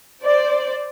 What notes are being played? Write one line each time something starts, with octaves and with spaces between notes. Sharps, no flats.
C5 D5